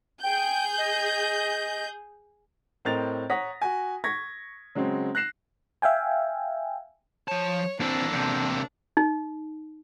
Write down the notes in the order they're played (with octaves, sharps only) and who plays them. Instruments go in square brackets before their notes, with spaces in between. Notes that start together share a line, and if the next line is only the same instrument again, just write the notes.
[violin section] G#4 G6 [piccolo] G5
[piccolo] D#5
[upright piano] A2 C4 A#4 D#5 A6 F7
C#5 F#5 A#5 D#6 A#6 B6
F#4 G#5
C#6 G#6 A#6 B6
C#3 F#3 G#3 C4
F#6 A#6 C7 E7
[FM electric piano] E5 F5 G5 G#5
[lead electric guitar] F3 A5 [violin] C#5
[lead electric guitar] E3 C4 [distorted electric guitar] A#3 A4 [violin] D4
[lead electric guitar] E2 C3
[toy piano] D#4